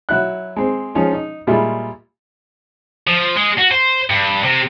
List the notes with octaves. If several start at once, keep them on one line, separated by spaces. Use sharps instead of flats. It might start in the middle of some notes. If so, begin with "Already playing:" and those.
F#3 E4 F#6
G#3 C4
F3 G#3 C#4 D#4 F4
D#4
A#2 G3 G#3 E4 F4
F3
G#3
F#4
C5
G2
C3